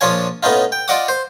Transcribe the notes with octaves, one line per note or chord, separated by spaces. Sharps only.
A#1 F3 D4 F4 C#5 G#5
A2 B3 C#4 D#4 F4
G5
F4 D5 D#5 F#5 D6 D#6
C5